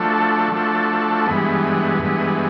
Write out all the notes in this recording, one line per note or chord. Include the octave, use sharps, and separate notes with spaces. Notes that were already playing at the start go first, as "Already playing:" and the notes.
Already playing: F3 A3 D4 F#4 A4
F3 A3 D4 F#4 A4
G2 E3 G#3 B3
G2 E3 G#3 B3